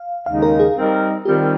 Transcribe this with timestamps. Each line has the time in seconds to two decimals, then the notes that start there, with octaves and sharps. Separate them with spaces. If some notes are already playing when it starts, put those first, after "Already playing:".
Already playing: F5
0.26 D#2 C#3 G#3 D#4 F5
0.42 A#4
0.59 G#4
0.76 G3 C4 D#4 A#4
1.25 D#3 G3 C4 F4 G4 A#4